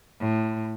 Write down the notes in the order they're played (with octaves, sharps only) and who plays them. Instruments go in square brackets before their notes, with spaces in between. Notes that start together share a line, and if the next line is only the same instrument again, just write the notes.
[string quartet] A2